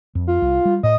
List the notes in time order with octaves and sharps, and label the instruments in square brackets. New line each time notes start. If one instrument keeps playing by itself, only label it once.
[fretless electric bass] F2
[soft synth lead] F4
[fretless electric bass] C2
G3
[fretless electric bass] A2 [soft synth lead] D#5